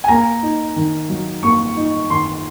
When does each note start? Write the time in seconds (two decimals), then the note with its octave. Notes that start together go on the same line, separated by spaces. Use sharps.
0.04 G#5
0.08 A#3 A#5
0.43 D#4
0.76 D#3
1.09 F#3
1.43 A#3 C#6
1.77 D#4
2.10 D#3 C6